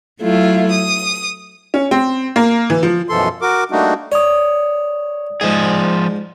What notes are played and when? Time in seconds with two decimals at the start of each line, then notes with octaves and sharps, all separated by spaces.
0.21 F#3 A3 E4 F4
0.71 D#6
1.74 C#4
1.91 C4
2.36 A#3
2.70 E3
2.83 F3
3.08 F#2 B2 E3 F3 A4 C6
3.42 F#4 A#4 D6
3.71 G3 A3 A#3 D4 D#4 F#4
4.12 C#5 D5 D#6
5.41 G#2 F3 G#4